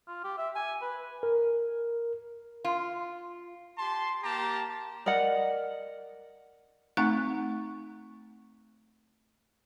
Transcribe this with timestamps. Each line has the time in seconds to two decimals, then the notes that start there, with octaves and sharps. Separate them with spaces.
0.08 F4
0.24 G4
0.38 E5
0.55 G#5
0.82 B4
1.23 A#4
2.65 F4
3.78 G4 A5 C6
4.23 A#3 G4 A5 A#5
5.06 A#4 D5 D#5 F#5
6.97 A3 C4 D#4 F#5 A#5 C#6